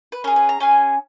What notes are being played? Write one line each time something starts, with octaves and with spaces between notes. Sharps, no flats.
B4
C#4 G#4 A#4
B4
A#5
C#4 G#4 G#5